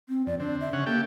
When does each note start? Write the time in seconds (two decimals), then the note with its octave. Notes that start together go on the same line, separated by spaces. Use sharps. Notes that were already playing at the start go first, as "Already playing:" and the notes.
0.09 C4
0.27 F2 D5
0.40 D3 C4 D4
0.61 E5
0.73 C#3 C#4 F#5
0.86 A#3 G4 A4 G5